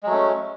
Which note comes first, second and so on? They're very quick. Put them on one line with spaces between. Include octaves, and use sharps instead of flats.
G#3 F#3 A3 C#4